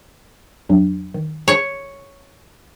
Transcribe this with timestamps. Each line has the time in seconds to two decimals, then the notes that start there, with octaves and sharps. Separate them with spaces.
0.69 F2 F#3 D4
1.14 D#3
1.48 C#5